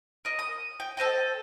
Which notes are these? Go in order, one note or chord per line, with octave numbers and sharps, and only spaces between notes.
A#4 D#5
D#6
G5
A4 C5 D#5 G5